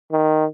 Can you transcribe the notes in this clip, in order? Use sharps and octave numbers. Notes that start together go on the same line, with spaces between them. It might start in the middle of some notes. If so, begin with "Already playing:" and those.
D#3